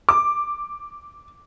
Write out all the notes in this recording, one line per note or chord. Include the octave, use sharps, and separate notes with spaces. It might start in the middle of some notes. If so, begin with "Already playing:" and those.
D6